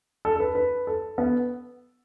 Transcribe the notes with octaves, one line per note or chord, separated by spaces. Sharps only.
A4
A4
B4
B4
A4
B3